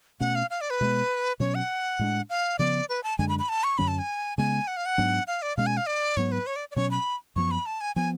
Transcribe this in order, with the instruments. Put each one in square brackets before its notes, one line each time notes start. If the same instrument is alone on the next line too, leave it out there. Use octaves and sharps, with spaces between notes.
[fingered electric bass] B2 A3 C#4 [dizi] F#5
[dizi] F5
F5
D5
B4
[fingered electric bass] B2 G#3 B3
[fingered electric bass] B2 F#3 C#4 [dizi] C#5
[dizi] F#5
[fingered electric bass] A2 G#3 D4
[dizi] F5
[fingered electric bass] C#3 F3 B3 [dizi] D5
[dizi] B4
A5
[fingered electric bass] F#2 D3 G#3 D4 [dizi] G#5
[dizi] B5
B5
A5
C#6
[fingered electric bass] F#2 D3 F#3 C#4 [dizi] B5
[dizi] A5
G#5
[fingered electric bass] C#3 G#3 B3 [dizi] G#5
[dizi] F#5
F5
F#5
[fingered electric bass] G#2 F#3 B3 D4
[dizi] F5
D5
[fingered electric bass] B2 G#3 C#4 [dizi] F5
[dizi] G#5
F5
D5
[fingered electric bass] G#2 F#3 B3 [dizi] C#5
[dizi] B4
C#5
D5
D5
[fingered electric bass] B2 F#3 C#4 [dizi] C#5
[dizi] B5
[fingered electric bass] F#2 F3 B3 [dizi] C#6
[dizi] B5
A5
G#5
[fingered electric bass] F3 B3 [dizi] G#5